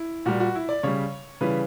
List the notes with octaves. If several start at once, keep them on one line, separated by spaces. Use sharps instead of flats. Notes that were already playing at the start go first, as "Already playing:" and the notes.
Already playing: E4
A#2 G3 F#4
F#4
E4
D5
C#3 G3 C#5
C#3 E3 G3 B4